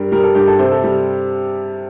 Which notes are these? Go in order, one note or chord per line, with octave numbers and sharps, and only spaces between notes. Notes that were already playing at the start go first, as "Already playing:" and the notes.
Already playing: G2 G3 A#4
G3 A#4
A4
G2 G4
A4
C3 C5
A4
G3